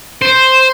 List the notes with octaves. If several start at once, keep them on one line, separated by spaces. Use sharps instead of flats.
C5